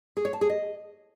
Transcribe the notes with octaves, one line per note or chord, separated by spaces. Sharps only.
G#4
C#5
A5
G#4
D#5